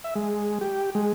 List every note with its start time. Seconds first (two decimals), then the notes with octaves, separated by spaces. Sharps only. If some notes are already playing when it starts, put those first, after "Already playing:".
0.04 E5
0.16 G#3
0.61 G4
0.95 G#3